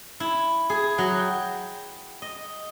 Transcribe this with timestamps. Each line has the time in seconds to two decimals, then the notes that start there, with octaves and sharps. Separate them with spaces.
0.20 E4
0.70 G#4
0.98 F#3
1.19 G5
2.22 D#5